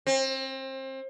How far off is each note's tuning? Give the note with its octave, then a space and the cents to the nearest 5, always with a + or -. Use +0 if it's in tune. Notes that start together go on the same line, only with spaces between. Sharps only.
C4 +30